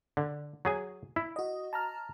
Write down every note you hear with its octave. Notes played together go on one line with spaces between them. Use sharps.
D3
F#3 G#4 G#5
E4
F#4 D#5
A5 A#5 F6